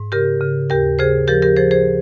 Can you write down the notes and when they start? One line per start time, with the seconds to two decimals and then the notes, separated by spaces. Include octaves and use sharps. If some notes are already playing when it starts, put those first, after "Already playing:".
Already playing: G#2
0.12 C#3 G4 A#4
0.41 C#3
0.70 D#2 G4 A#4
0.99 C#3 G#4 C5
1.28 F3 G4 A#4
1.42 G4 A#4
1.57 F3 G#4 C5
1.71 G#4 C5